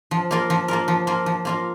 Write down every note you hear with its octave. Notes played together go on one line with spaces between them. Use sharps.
F3
A#3 F4 A#4
F3
A#3 F4 A#4
F3
A#3 F4 A#4
F3
A#3 F4 A#4